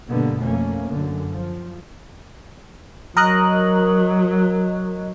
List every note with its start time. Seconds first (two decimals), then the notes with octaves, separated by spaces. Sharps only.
0.10 G2 B2 D3 A#3 B3
0.40 F2 A3 A#3 C#4
0.89 F#2 D3
1.31 F3
3.17 F#3 A#4 D#5 F#6